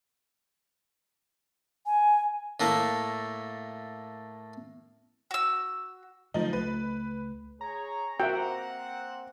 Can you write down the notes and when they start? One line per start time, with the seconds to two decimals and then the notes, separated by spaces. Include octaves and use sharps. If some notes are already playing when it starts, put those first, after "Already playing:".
1.86 G#5
2.60 A2 A3 A#3
5.31 F#4 E6
6.34 D3 F3 F#3 A3 D#4
6.53 C#2 A3 B4
7.61 G#4 C#5 A#5
8.20 A#3 C4 F#4 A#4 E5 F#5 G5